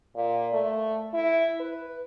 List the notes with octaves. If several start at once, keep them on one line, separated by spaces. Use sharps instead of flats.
A#2
A3
E4
B4